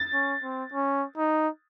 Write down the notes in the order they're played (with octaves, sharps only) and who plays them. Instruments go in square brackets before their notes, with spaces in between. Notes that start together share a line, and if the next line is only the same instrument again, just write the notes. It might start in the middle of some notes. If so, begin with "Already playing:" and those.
Already playing: [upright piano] A6
[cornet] C#4
C4
C#4
D#4